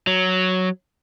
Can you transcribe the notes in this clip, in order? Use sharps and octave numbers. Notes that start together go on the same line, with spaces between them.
F#3